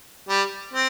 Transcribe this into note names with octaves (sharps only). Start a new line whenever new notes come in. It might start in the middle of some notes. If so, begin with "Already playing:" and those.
G3
C4